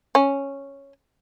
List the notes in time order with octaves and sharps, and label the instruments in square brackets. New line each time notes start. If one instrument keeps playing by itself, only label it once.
[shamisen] C#4